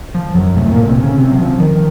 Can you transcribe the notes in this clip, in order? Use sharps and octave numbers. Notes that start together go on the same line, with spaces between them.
F3
F#2 F#3
C2 A2 C3 A3
A#2 A#3
C3 C4
C#3 C#4
C3 C4
F#3
F3
D#3